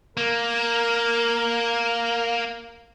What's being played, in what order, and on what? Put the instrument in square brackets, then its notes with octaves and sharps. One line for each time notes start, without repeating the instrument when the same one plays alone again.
[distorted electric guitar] A#3 [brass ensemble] A#4